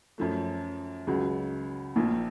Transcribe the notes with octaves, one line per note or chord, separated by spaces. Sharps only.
F#2 F3 A3
C#2 C#3 F#3
A#1 A#2 F3 A#3